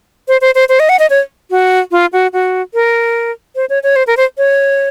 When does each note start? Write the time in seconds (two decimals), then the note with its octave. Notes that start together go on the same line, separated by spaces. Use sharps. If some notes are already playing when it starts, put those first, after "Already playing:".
0.28 C5
0.41 C5
0.55 C5
0.69 C5
0.80 D#5
0.89 F#5
0.99 D#5
1.10 C#5
1.51 F#4
1.92 F4
2.13 F#4
2.33 F#4
2.74 A#4
3.56 C5
3.70 C#5
3.83 C#5
3.96 C5
4.07 A#4
4.17 C5
4.38 C#5